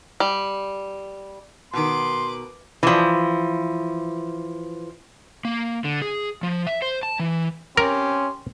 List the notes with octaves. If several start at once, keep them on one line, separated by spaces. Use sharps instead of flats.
G3
B2 D#3 B4 C6 D6
E3 F3
A#3
D3
G#4
F3
E5
C5
A5
E3
C#4 G4 A#4 C6